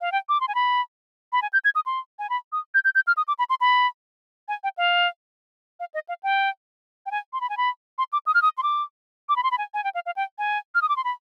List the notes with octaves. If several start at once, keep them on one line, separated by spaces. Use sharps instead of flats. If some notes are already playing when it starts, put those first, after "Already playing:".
F5
G5
D6
C6
G#5
B5
B5
G#5
G6
G#6
D#6
C6
G#5
B5
D#6
G6
G6
G6
F6
D#6
D6
B5
C6
B5
G#5
G5
F5
F5
D#5
F5
G5
G5
G#5
C6
B5
G#5
B5
C6
D6
D#6
F6
D#6
C6
D6
D6
B5
C6
B5
G#5
G#5
G5
F5
F5
G5
G#5
F6
D#6
D6
C6
B5